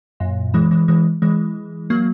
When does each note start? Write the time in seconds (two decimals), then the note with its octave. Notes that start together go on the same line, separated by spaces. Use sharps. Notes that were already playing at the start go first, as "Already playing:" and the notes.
0.20 F#2 A#2
0.54 E3 G#3
0.71 E3 G#3
0.88 E3 G#3
1.22 E3 G#3
1.90 F#3 A#3